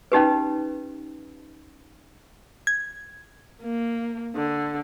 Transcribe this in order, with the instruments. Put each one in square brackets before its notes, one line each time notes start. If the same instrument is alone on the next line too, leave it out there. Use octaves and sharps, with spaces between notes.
[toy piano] C#4 D#4 G4 B4
[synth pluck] G#6
[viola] A#3
D3